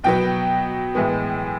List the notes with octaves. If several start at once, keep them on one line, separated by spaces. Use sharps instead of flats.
B2 F#3 B3 G5
A2 E3 G#3 B3